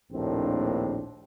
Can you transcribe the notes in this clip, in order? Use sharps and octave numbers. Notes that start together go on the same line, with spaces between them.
A#1 D#2 A2 C4 D4